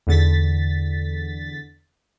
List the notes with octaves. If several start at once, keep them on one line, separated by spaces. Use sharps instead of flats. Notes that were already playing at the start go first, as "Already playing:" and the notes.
E2 D3 A6 B6